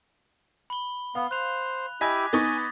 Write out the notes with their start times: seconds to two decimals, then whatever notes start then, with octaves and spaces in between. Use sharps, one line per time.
0.70 B5 G7
1.15 B3 F5
1.31 C5 F#6 F7
2.01 E4 G4 D#5 G#5 D6 G#6 B6
2.33 B3 D#4 G#5 C#6 D#6 A6 A#6